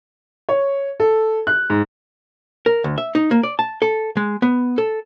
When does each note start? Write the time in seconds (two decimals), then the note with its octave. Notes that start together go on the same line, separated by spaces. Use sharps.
0.49 C#5
1.00 A4
1.47 F#6
1.70 G#2
2.66 A#4
2.84 D2
2.98 E5
3.15 D#4
3.31 A#3
3.43 D5
3.59 A5
3.82 A4
4.17 G#3
4.42 B3
4.78 A4